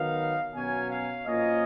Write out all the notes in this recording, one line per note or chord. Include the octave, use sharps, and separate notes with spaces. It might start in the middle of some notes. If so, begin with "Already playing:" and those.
Already playing: D#3 F#3 B3 D#4 F5
B2 F#3 C#4 G#5
F5
A#2 F3 A#3 C#4 D#5